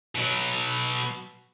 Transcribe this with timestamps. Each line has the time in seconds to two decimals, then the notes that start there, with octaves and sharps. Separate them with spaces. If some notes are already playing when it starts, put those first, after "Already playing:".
0.15 B2 F#3